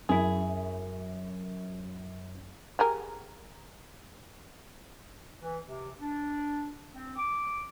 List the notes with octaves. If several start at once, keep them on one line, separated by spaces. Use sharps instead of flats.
F#2 E4 G#4
G4 G#4 A#4
E3
C3
D4
C4
D6